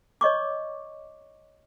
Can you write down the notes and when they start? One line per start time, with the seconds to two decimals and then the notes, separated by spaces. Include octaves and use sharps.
0.21 C#5 D#5 C#6 D6